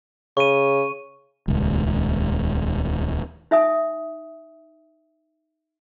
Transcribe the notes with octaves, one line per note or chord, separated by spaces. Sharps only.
C#3 C#6 D#7
D#1 C#2
D#4 E5 G#5 D#6